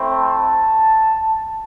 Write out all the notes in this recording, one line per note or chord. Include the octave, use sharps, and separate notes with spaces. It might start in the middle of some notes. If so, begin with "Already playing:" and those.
Already playing: A3 C4 E4
A5